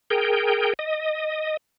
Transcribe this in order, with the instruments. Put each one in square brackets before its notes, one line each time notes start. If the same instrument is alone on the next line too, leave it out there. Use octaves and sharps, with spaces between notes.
[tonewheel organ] G#4 A#4 G5
D#5